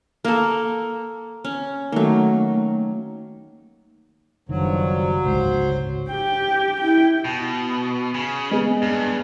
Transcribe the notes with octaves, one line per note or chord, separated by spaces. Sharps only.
A#3 A4
C#4
D#3 F#3 A3 A#3
F#1 G2 D#3 F3 F#3
G1 C#2 G#2 C5
G4 G5
E4 G5
B2
C#3
G#3 B3
G2